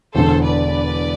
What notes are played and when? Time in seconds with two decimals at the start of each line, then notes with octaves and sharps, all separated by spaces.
0.14 E1 E2 D3 A4 C5
0.43 B4 D5